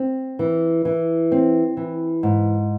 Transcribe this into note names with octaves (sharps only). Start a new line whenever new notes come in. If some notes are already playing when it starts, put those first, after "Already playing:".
Already playing: C4
E3
E3
C4
E3
G#2